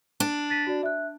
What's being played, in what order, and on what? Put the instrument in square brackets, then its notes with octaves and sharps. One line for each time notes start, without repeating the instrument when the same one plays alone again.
[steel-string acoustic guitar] D4
[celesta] A6 B6 D#7
F#4 D5
E5 F#6